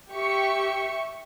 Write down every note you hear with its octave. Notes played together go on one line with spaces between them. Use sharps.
G4 E5 C#6 C#7